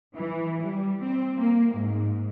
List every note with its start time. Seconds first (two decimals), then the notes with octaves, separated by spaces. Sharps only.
0.15 E3
0.62 G3
1.00 C4
1.37 A#3
1.75 G#2